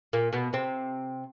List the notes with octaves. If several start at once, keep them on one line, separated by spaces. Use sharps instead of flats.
A#2 A#3
B2 B3
C3 C4